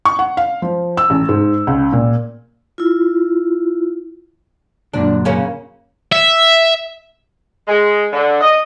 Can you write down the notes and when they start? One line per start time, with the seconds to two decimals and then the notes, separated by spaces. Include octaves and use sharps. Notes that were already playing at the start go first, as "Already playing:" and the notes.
0.05 C#6
0.19 F#5
0.37 F5
0.62 F3
0.97 E6
1.10 A1
1.29 G#2
1.67 C#2
1.93 A#2
2.78 E4 F4
4.94 F#2 A#2 D3 D4
5.25 C#3 A#3 C#4
6.12 E5
7.68 G#3
8.13 D3
8.41 D#5